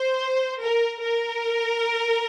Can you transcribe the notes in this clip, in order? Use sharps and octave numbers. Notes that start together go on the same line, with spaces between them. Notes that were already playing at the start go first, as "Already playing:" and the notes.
Already playing: C5
A#4
A#4